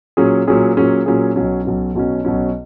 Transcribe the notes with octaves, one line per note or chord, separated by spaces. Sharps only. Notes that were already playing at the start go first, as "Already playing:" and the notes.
A#2 F#3 C#4 G#4
A#2 F#3 C#4 G#4
A#2 F#3 C#4 G#4
A#2 F#3 C#4 G#4
B1 B2 F#3 C#4
B1 B2 F#3 C#4
B1 B2 F#3 C#4
B1 B2 F#3 C#4